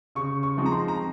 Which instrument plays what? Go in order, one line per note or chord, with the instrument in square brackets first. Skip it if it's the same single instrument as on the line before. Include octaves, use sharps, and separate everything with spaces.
[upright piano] C#3 C#6
C#6
F3 G#3 C4 D#4
A#5
C6
A#5